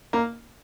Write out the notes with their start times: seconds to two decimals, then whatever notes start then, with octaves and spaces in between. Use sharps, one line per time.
0.13 A#3